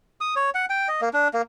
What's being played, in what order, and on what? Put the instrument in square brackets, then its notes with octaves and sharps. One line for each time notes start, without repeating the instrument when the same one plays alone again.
[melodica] D#6
C#5
F#5
G5
D#5
A#3
D4
A#3